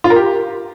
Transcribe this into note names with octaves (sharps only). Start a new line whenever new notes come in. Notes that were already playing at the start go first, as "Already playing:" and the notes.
F4
A#4
G4